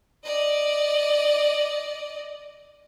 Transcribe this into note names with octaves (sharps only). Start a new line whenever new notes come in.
D5 D#5